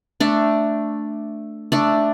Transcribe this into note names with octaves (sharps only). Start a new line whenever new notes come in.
A3 D4
A3 D4